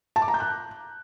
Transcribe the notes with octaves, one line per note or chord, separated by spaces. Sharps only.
A5
D6
A#5
G6
F#6